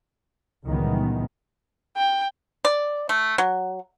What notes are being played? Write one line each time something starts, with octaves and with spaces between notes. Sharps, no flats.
C#2 A#2 D#3 E3 G3 B3
G5
D5
A3
F#3